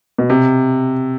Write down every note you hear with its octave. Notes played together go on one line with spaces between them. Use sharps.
B2
C3